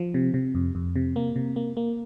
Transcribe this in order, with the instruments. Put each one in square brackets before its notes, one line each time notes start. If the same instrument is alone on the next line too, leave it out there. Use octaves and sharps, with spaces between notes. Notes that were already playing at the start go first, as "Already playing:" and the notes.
Already playing: [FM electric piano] F3
C3
C3
F2
F2
C3
A#3
C3
A#3
A#3